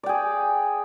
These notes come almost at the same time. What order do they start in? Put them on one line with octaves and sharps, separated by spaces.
D5 G5 G#4